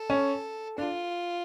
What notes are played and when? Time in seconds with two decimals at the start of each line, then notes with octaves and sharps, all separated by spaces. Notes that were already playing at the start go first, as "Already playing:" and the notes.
Already playing: A4
0.10 C#4
0.78 D4 F4